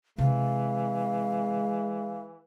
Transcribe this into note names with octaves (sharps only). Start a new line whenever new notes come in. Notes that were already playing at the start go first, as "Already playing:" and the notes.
C3 E3 G#3 F5